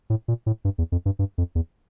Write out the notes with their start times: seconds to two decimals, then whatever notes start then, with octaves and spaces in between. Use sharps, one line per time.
0.10 A2
0.28 A#2
0.46 A2
0.65 G2
0.78 E2
0.92 F2
1.06 G2
1.19 G2
1.38 F2
1.55 E2